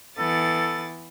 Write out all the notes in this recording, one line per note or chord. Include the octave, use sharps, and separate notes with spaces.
E3 B3 A4 A6